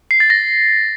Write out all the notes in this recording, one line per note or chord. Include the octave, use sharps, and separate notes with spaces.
C7
A6
A#6